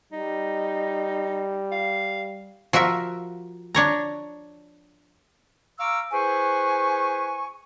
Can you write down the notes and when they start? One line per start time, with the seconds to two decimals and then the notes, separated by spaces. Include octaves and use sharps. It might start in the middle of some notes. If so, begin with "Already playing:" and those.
0.13 G3 D#4
1.72 F5
2.73 F3 F#4 A#4 E5
3.75 D4 C#5 A#5
5.80 F5 A#5 C#6 D6 E6 F6
6.12 E4 G#4 B4 C5 G#5 C#6